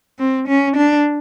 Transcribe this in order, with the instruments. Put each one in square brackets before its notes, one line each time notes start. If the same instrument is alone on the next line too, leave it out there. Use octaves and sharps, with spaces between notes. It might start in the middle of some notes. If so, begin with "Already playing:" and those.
[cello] C4
C#4
D4